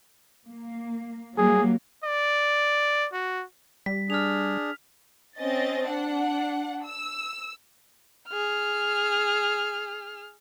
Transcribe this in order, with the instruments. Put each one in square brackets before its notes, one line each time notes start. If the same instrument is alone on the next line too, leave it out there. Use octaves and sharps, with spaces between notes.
[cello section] A#3
[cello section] F#3 G3 A#3 [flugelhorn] G#4
[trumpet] D5
F#4
[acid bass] G3 [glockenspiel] B6
[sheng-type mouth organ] D4 G#4 [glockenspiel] F6 F7
[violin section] C4 C#4 D#5 A6
D4 F#5
E6
[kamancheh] G#4 F6